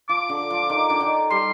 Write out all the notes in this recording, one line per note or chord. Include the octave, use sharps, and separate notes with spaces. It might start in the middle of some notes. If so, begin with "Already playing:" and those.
F3 D6
D3
F3
D#3
D3
D#3
G3 C6